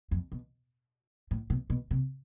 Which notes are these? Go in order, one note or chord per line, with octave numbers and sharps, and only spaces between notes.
F2
B2
A2
B2
B2
C3